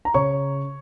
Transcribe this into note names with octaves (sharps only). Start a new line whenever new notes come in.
A#5
C#3 C#5 C#6